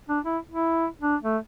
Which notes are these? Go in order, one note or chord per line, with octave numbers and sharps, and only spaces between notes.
D4
E4
E4
D4
A3